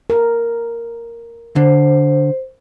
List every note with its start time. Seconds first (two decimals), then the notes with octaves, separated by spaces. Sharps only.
0.10 A#4
1.56 D3 C5